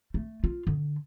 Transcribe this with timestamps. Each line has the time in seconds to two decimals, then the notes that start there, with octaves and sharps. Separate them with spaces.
0.14 A3
0.44 F4
0.67 D3